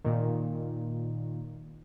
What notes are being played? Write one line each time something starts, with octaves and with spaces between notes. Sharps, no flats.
A#2 D#3